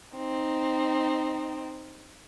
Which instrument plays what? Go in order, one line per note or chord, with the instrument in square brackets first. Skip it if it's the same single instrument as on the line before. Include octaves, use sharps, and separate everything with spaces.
[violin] C4 D#4